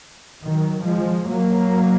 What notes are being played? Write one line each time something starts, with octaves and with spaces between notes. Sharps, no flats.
D#3 F#3
F3 G#3
F#3 A#3